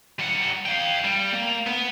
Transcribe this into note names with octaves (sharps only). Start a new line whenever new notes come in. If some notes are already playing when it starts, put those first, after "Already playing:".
G3 F#5
F5 G5
G3
A#3
B3